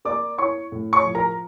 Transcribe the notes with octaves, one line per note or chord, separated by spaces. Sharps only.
A#3 D5 D6
E4 C#5 C#6
A2
C#5 C#6
F3
A#4 A#5